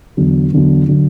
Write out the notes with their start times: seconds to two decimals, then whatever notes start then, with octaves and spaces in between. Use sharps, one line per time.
0.17 E2 D3 F#3
0.52 E2 D3 F#3
0.88 D3 F#3